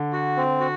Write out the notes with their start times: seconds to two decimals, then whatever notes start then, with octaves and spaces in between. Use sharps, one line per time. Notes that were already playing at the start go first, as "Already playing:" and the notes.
Already playing: D3
0.13 F#4
0.37 C4
0.60 F#4